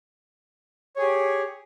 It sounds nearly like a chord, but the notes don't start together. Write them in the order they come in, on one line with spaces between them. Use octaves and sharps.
C#5 G#4 G4